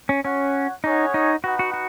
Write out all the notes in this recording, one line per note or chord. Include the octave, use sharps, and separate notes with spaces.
C#4
C#4 F#4 C#5 F#5
C#4 D#4 G#4 C#5 F#5
D#4
D#4 F#4 B4 F#5
F#4
F#4